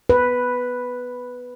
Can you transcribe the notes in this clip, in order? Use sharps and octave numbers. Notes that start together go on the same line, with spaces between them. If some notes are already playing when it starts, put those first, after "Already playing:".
B4